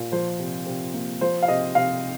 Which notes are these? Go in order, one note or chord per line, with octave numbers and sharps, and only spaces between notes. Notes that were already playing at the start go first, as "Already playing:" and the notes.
Already playing: A#2
F3 C5
C3
C3
A#3
F3 C5
F5
C3 D#5
C3 F5